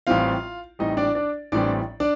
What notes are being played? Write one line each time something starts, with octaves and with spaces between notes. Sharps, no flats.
A1 A2 G3 C4 F4 F5
A1 A2 G3 C4 D#4 D#5
D4 D5
D4 D5
A1 A2 G3 C4 D4 D5
D4 D5